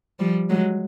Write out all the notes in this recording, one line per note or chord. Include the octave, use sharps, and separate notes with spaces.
F3 G3
F#3 G#3